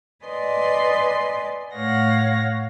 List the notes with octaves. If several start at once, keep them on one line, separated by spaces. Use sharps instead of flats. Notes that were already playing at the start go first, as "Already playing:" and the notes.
B4 D5 D#5 G#5 C6
A2 C#5 F5 F#5 A#6